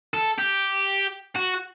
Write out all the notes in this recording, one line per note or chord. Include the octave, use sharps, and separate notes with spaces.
A4
G4
F#4